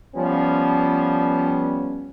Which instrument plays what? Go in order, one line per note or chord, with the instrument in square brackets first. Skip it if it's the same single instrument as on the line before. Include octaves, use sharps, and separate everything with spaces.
[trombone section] F3 G3 B3 C#4